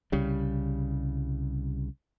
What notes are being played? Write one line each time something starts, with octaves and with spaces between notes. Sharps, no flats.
C2 C#3 G3